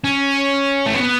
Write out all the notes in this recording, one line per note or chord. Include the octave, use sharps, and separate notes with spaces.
C#4
A3
B3